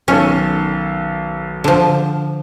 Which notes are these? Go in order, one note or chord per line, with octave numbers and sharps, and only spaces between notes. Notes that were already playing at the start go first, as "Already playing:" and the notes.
B1 D#3 C#4 A4
D3 F3